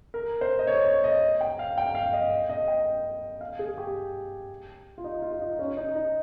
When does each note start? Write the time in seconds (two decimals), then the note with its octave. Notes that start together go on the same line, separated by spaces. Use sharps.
0.14 A#4
0.41 C5
0.59 D#5
0.67 C#5
0.86 C#5
1.04 D#5
1.41 G5
1.59 F5
1.78 G5
1.95 F5
2.13 D#5
2.49 D#5
2.68 G5
3.41 F5
3.59 G#4
3.78 G4
4.98 F4
5.04 D#4
5.22 F4
5.32 F4
5.41 D#4
5.59 C#4
5.77 D#4
5.95 D#4